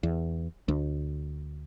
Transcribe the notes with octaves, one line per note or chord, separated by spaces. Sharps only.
E2
D2